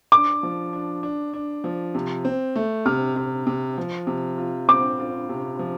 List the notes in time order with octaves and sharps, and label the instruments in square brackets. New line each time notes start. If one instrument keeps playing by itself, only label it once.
[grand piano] D4 [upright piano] D6
[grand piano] F3
D4
D4
D4
F3
C3
C4
A3
[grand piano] C3 [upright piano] F6
[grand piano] C3
C3
F3
C3
F4
[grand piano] C4 [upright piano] D6
[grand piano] F4
C3
F3